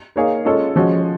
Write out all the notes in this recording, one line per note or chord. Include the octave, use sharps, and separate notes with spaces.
A#3 D#4 G#4 C#5 F5
G#3 C#4 F4 A4 C#5
F3 G#3 C#4 F#4